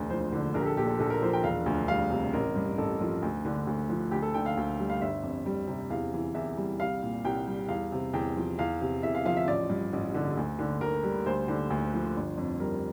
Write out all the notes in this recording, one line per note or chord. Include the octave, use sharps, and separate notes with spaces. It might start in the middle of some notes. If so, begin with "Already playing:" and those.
Already playing: E1 D2
F3 C5
D3
A#1 A#4
G4
A4
A#2 G4
A4
A#1 A4
A#4
F3 C5
G5
E1 F5
D2
G3 F5
C3
A1 A#4
G2
A1 A4
F3
D2
D3
D2
F3
D2 G4
A4
D3 G5
F5
D2
G3
F5
G1 E5
F2
G3
C3
E2 F5
E3
E2 E5
G3
C2 F5
A#2
C2 G5
G3
E2 F5
C3
E2 G5
F3
E2 F5
C3
E2 E5
F5
F3 F5
E5
A1 D5
G2
A1
D3
D2
D3
D2 A#4
G3
D2 C5
D3
D2
F3
G1
F2
G3 A#4